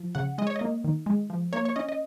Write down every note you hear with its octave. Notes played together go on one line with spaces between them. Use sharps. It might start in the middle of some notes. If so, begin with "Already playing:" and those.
Already playing: F3
C#3 F#5
G#3 D#5
C#5
D#5
A#3
D#3
G#3
F3
A#3 C#5
C#5
C#4 D#5
D#5